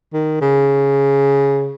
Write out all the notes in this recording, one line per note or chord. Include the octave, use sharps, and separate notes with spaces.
D#3
C#3